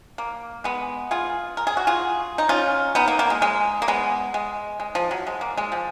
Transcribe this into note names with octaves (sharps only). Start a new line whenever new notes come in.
A#3
G#3 B3
F4 G#4
A#4
G#4
F#4
F4 G#4
D#4
C#4 F4
B3 D#4
A#3
A#3
G#3
G#3
A#3
G#3 B3
G#3
G#3
F3
F#3
G#3
A#3
G#3
F3